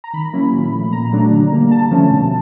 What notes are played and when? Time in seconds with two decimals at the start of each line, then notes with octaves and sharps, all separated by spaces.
0.04 A#5
0.13 D#3 B5
0.33 F#3 A#3 C#4 E4
0.53 A#2
0.72 F3 A3
0.93 A#2 A#5
1.13 F#3 A3 D4
1.31 D3
1.52 G3 A#3
1.70 D3 A5
1.91 F3 A3 C#4
2.11 B2